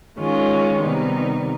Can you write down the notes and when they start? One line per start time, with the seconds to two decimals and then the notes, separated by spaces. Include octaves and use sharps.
0.18 D#3 G#3 C#4 F4
0.82 C3 D#3 G3 B3 D#4